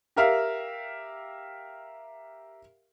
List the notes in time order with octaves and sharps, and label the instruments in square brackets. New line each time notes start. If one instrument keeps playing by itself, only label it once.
[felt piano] G4 A#4 E5 F5